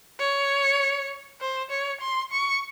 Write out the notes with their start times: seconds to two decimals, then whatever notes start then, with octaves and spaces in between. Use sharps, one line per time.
0.19 C#5
1.41 C5
1.70 C#5
2.01 C6
2.32 C#6